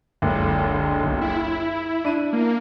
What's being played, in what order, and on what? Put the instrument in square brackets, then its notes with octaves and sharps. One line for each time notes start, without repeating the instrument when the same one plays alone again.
[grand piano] F#1 C#2 [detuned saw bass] D3
[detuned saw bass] B1
E4
[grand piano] D4 D#7
[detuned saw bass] A#3